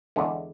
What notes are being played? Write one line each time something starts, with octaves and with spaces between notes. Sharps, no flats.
E2 D3 G#3